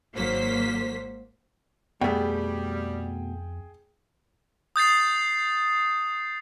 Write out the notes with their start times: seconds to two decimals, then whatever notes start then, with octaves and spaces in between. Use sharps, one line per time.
0.15 G#1 F#3 A#3 C5 B6
2.01 F2 B2 G3 A3 G#4 G5
4.76 D#6 G6 A6 C7